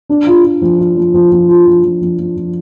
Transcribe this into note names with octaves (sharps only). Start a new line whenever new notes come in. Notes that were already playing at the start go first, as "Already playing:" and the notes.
D4
F4
F4
F3
F4
F3
F3
F3
F4
F3
F3
F3
F3
F3